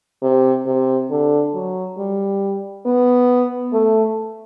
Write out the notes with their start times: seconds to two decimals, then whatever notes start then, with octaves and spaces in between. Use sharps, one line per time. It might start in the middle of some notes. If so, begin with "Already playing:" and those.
0.22 C3
0.66 C3
1.10 D3
1.54 F#3
1.98 G3
2.85 B3
3.73 A3